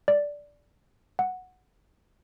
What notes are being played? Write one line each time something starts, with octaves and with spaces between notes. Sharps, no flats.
D5
F#5